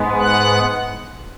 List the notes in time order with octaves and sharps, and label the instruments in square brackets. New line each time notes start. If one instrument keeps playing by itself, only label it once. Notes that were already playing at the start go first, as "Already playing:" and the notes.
Already playing: [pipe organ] G#2 G#3 B3
F#5 F#6